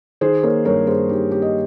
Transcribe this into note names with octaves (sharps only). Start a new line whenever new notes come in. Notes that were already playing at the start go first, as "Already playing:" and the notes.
D#3 G#4 C5
A#3 A#4 C#5
G2 A#4 C#5
G2 G#4 C5
D#3 G4
A#3 G4
D#5